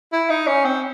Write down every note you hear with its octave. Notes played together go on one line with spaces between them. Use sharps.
E4
D#4
C#4
C4